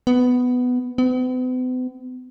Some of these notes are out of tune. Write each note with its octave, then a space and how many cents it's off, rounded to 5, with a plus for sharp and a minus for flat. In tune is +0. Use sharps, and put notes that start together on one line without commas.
B3 +10
B3 +45